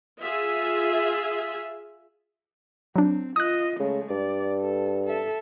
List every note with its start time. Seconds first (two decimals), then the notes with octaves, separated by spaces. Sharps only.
0.21 F4 G#4 E5
2.96 F#3 C4 D4
3.36 F4 D#5 D#6 F#6
3.80 C#3 G#3 A3
4.10 G2 D5
4.60 A4
5.05 A4 E5